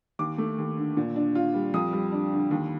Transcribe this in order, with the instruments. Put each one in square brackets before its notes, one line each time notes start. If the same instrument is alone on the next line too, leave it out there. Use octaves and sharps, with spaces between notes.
[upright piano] D#2 D6
A3
D#2
D3
A#2
D4
F4
G3
F2 D#6
G3
D4
D3
D#2